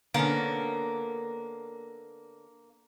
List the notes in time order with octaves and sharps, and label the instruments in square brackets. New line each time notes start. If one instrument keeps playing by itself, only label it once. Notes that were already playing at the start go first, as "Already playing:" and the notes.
[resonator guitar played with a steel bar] D3 B3 C#4 [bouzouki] A#3